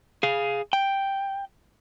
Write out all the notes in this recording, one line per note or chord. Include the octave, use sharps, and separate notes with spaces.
G#4 F5
G5